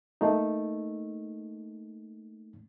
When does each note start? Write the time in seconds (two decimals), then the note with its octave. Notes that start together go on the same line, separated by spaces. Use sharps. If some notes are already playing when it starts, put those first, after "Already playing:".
0.21 A3 A#3 D#4